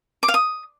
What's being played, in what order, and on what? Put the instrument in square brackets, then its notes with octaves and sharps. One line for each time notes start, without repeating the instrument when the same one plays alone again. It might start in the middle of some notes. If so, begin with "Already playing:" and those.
[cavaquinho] D6
F5
D#6